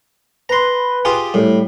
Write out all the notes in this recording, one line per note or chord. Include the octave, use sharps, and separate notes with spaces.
B4 A#5 C6
F4 G4 G#4
A2 G3